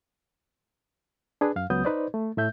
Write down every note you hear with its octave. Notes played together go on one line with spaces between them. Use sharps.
D4 G#4 B4
F#2 F5
C#2 F#3 B3 D#6 G6
D#4 B4 C5 D5
A3
A2 A3 E5 G6